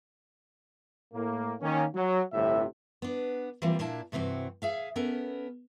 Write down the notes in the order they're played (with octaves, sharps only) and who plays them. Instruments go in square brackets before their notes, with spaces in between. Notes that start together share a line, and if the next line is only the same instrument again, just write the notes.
[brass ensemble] A2 A#3
D#3 A#3 C#4
F#3
G1 A2 C3 E5
[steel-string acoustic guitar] B3 D4
E3 F3 G3 A#3 C4 F4
A#2 A#3 D4 E4 A5
G2 C3 E3 C4 F#4
G#4 E5 F5
B3 C#4 A4 A#4